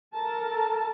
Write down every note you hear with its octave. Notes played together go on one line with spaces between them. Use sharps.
A4 A#4 A5